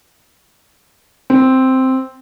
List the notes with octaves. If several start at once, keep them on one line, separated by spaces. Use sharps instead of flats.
C4